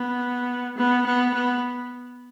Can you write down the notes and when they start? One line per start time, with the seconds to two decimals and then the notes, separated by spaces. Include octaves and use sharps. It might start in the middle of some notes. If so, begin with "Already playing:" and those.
Already playing: B3
0.77 B3
1.06 B3
1.34 B3